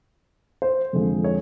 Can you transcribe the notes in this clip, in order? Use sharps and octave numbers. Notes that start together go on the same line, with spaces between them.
C5
F2 D3 F3 G#3
C#5